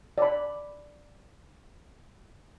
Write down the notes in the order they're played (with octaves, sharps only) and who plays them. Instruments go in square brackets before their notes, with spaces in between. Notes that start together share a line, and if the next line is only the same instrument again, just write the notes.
[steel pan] D5 B5